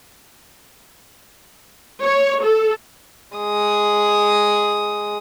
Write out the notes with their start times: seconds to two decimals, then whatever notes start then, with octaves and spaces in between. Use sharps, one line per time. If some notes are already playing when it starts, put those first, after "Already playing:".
2.03 C#5
2.41 A4
3.37 G#3 D#6